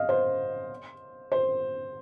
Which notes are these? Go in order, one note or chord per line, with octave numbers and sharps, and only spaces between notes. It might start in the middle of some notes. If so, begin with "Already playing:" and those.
Already playing: D#5 F5
C5
C5